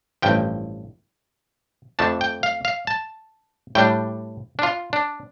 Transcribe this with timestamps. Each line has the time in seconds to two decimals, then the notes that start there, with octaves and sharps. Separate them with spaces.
0.22 A1 G2 F3 G5
1.99 F2 F3 A3 D4 A5
2.21 G5
2.43 F5
2.65 F5
2.87 A5
3.75 A2 G3 D4 G5
4.59 D4
4.63 F4
4.93 D4